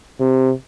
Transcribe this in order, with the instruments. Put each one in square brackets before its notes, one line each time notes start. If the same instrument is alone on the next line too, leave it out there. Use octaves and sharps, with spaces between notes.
[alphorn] C3